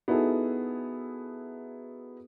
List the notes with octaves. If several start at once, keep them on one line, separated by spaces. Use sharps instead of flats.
B3 D#4 E4 F#4 G#4 A4